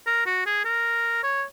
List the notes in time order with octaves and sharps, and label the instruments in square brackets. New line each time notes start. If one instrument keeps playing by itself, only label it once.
[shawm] A#4
F#4
G#4
A#4
C#5